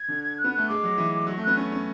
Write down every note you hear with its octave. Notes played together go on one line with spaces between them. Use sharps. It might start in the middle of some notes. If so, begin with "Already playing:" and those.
Already playing: G#6
D3
F#6
B3
A3 F#6
G#3 D6
F#3
E3
F#3 C#6
A3
B3 F#6
C#4 C#6
C#4